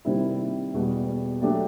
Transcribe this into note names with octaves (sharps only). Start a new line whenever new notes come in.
C3 D#3 G3 C4 E4
E2 B2 G3
F#3 A3 D4 G4